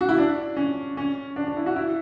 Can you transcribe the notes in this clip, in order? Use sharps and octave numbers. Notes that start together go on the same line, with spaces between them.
F#4
E4
D4
C#4
C#4
D4
D4
E4
F#4
E4